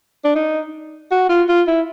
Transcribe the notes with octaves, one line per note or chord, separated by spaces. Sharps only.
D4
D#4
F#4
F4
F4
E4